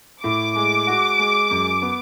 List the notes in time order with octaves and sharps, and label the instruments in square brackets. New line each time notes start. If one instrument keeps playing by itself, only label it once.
[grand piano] A2 [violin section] D6
[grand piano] G#3
F#4
G#3
F#2
B3